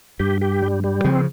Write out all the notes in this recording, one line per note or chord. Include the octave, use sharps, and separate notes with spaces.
G2 G4
G4
G3
G3
C#3 F3 C4